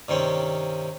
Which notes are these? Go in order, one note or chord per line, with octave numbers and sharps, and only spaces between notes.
G2 C3 D#3 C4 C#4